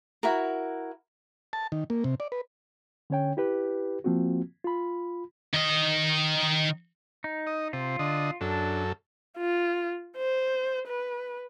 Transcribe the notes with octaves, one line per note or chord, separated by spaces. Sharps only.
E4 F#4 A#4
A5
D#3
A#3
C3
D5
B4
D3 C#4 C#5 G5
E4 G4 B4
F3 A#3 C4 F4 F#4
F4 B5
D#3 D#5
D#4
D#5
C3 F4
D3 D#5
F#2 D4 A4
F4
C5
B4